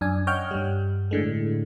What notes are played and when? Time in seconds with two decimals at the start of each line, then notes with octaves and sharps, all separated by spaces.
0.01 F#2 D4 G#5
0.27 C#5 D#5 F#5 G5 F6 G6
0.51 G2 G3
1.11 A2 D3 G#3